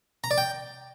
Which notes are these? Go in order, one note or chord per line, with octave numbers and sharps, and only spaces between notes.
A#5
D5
G5